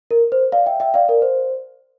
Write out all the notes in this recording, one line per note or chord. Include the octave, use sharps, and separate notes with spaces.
A#4
C5
D5 F5
E5 G5
E5 G5
D5 F5
A#4 D5
C5